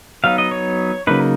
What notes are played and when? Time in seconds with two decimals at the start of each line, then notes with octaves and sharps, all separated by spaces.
0.24 F#3 B3 D#4 F5
0.38 D#5
0.51 C#5
1.07 C#3 F#3 A#3 D#4 B4